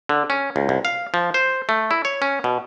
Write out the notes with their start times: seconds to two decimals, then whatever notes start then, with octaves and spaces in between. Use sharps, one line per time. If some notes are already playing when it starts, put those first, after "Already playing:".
0.09 D3
0.30 C#4
0.56 C#2
0.69 C2
0.85 F5
1.14 F3
1.34 C5
1.69 A3
1.91 E4
2.05 C#5
2.22 C#4
2.44 B2